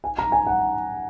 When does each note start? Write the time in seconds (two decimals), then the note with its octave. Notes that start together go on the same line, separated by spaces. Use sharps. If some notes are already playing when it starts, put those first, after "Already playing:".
0.04 G#5
0.18 A#5
0.32 G#5
0.47 F#5